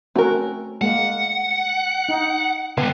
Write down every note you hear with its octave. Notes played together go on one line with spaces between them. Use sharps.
A3 C4 C#4 F#4 A#4
G#3 A#3 F#5
D#4
D3 G3 B3